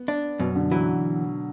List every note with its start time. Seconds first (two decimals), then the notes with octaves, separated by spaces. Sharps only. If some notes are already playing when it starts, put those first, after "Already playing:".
Already playing: B3
0.08 D4
0.40 F#2 B2
0.55 D3
0.72 E3 F#3